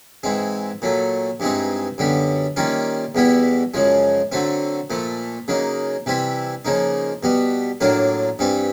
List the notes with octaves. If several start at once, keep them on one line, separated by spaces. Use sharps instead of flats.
G#2 E3 G#3 C4
A#2 F#3 A3
G2 E3 G#3 C4 D#4
F#2 D3 G3 B3
D#3 G3 A#3 C#4 F4
E2 B2 G3 B3 E4
F#2 C#3 F3 G#3
D3 F#3 A3 C4
A#2 F3 A3
C#3 F#3 A#3 D#4
C3 E3 G3 C4 E4
C#3 F3 A#3 D#4
B2 G3 B3
A2 F#3 A#3 D4 F4
G2 E3 G3 C4